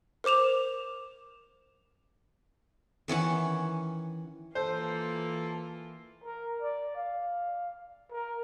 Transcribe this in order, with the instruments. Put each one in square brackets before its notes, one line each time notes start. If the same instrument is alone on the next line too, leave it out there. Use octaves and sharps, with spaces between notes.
[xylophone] A#4 C5 D6 E7 F7
[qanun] D#3 E3 C#4 F#5
[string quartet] E3 A#3 F4 [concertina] A4 [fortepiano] C5
[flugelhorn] A#4
D5
F5
A#4